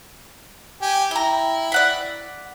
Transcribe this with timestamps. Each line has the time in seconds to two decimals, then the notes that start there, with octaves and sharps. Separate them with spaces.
0.81 G4 G#5
1.11 E4 G5 A#5
1.72 D5 F#5 B5